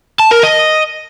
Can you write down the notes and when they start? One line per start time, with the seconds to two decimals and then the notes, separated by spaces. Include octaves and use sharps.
0.20 A5
0.31 A#4
0.43 D#5